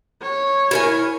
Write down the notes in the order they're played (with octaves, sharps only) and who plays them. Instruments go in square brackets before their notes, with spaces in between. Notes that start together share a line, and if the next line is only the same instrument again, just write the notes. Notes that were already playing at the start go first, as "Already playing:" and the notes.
[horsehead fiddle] C#5
[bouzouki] E4 A#4 G#5